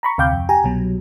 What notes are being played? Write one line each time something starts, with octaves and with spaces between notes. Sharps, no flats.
A#5 B5 C#6
D2 C3 F5 G5 D6 G6
F2
G4 G#5 A#5
C2 B2 F#3